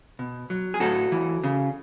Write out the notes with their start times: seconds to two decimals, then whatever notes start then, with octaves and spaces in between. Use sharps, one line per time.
0.19 B2
0.50 F#3
0.74 G#4
0.80 A2 F#4 A4
1.12 E3
1.43 C#3